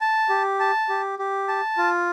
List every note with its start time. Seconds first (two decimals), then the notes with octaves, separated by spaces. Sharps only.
0.01 A5
0.29 G4
0.60 A5
0.89 G4
1.19 G4
1.48 A5
1.77 F4